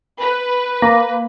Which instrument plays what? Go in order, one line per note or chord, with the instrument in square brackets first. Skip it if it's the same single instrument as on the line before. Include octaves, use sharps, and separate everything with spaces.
[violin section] B4
[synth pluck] A#3